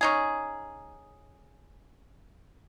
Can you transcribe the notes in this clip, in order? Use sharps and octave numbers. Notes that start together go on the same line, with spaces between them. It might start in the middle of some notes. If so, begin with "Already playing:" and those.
C#4 D#4 G#4